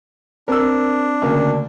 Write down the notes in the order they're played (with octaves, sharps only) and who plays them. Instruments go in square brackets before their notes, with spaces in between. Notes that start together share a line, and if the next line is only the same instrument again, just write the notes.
[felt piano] C4 [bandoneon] D4 [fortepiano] A#4 E6
[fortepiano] D2 A#3 [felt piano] C#3